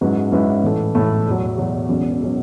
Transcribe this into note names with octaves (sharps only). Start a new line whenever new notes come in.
G#2 F#3 C#4 E4 B4
G#2 F#3 C#4 E4 B4
A2 E3 A3
A2 E3 A3
E2 B2 F#3
E2 B2 F#3
E1 E2 B2 F#3 C#4
B2 F#3 C#4